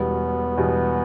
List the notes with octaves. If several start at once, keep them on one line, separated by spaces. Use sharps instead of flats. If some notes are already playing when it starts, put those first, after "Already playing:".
Already playing: E1 E2 B2 G3 B3
E1 E2 B2 G3